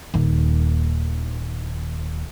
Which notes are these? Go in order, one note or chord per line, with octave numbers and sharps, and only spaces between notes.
D#1 D#2